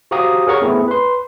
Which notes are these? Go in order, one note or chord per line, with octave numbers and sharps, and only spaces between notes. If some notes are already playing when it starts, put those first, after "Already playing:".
F#4 G4 C5 F5 A#5 D#6
G#4 A#4 C#5 F#5 A#5 C#6
A3 B3 C4 E4 G#4
B4 C6